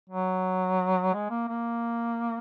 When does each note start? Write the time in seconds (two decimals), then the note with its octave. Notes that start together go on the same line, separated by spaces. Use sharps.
0.10 F#3
1.14 G#3
1.31 A#3
1.48 A#3